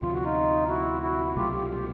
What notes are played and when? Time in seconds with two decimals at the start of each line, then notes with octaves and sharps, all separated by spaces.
0.02 D2 C3 F3 F4
0.12 F#4
0.24 D#4 F4
0.69 E4 F#4
1.02 E4 F#4
1.25 F#4
1.36 C2 B2 F#3 A3 F4 G4
1.53 F4 G4
1.70 F4 G4